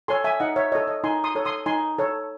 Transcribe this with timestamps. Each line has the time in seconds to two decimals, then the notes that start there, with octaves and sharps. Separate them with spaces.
0.08 A4 C#5 G#5 C6
0.24 E5 G#5
0.40 D#4 D#5 F#5
0.56 C#5 E5
0.72 A4 C#5 D#5
0.87 D#5
1.04 D#4 G#5 C6
1.24 C6 D#6
1.35 A4 C#5
1.45 C6 D#6
1.66 D#4 G#5 C6
1.98 A4 C#5